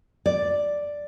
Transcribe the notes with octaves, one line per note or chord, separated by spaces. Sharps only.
D5